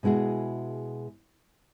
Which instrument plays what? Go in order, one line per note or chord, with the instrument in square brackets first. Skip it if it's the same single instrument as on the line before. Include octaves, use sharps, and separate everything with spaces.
[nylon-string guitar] B2 G#3 E4 F#4 G#4